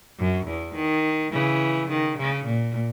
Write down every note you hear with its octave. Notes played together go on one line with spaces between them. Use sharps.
F#2
E2
D#3
C#3 E3
D#3
C#3
A#2